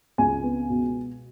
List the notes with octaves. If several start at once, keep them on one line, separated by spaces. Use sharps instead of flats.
C#2 G#5
B3
B2